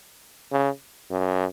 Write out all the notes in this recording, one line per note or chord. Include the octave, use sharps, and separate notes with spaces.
C#3
F#2